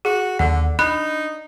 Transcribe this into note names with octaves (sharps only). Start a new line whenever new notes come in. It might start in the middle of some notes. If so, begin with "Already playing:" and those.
F#4 G#4
D#2 D3 F#5
D4 D#4 B5 F#6